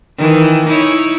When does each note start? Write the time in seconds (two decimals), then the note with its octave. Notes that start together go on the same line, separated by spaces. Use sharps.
0.18 D#3 E3
0.69 D#4 E4 C#5